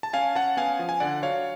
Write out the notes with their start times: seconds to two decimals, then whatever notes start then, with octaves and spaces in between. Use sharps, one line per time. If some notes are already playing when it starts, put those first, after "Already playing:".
0.03 A5
0.13 C#4 F5 G#5
0.35 C#4 F#5 A5
0.57 B3 F5 G#5
0.79 F3
0.89 G#5
1.00 D3 D5 F#5
1.22 F#3 C#5 F5